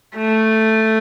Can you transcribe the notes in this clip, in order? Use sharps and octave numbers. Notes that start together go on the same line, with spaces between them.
A3